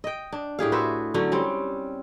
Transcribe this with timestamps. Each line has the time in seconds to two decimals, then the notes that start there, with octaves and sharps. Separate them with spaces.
0.04 D#5 G5
0.32 D4
0.59 A2 G4 G#4 F5
0.72 F#4 B4 C5 E5
1.14 D3 F#3 C#4 F#4
1.32 G3 C4 C#4